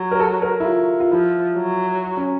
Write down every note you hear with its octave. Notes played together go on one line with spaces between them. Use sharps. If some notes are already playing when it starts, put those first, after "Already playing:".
Already playing: F#3
A#4
A4
A#4
E4
F4
F4
F3 E4
F#3
C#4